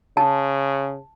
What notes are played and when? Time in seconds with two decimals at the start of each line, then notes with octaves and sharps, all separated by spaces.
0.17 C#3 A5